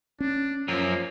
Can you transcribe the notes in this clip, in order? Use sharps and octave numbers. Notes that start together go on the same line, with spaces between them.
C#4 D4
F#2 F3 A#3